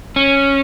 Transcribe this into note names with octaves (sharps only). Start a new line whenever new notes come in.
C#4